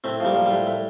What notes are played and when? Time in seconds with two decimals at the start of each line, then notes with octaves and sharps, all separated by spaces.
0.04 A2 A3 C4
0.20 F3 G3 A#3
0.35 F3
0.46 A2 G3
0.67 A2